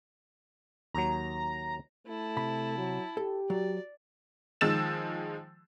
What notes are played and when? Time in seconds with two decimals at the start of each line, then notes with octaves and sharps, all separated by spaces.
0.94 D#2 F#3 A#5
2.07 A3 E4 A5
2.37 C3 B5
2.78 F#3
3.17 G4 A4
3.50 F#3 D5
4.61 D#3 F3 G#3 E6 A6 E7